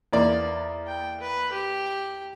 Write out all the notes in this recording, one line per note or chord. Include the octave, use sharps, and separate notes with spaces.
E2 A#3 D5
G5
B4
G4